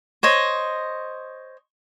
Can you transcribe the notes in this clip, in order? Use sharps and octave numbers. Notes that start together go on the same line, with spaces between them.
C5 C#5 D#5